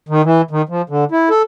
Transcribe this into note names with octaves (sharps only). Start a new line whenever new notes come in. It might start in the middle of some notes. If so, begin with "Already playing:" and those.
D#3
E3
D#3
F3
D3
E4
A4